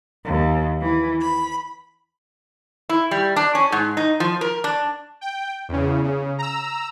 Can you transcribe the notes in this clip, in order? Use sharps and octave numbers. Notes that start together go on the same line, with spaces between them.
D#2
E3
B5
E4
G3
D4
C#4
G#2
D#4
F3
A#4
D4
G5
E2 C#3
C#3
A#5 E6